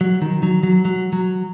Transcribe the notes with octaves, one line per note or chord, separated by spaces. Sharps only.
F#3
D#3
F#3
F#3
F#3
F#3